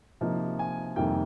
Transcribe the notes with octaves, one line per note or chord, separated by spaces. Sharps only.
C3 F3 A#3 D#4
G#5
F2 C3 D#3 G3 A#3 G5